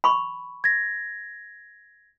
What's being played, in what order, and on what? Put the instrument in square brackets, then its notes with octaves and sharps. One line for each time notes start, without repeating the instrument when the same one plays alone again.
[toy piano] B5 C#6
[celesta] G#6 A#6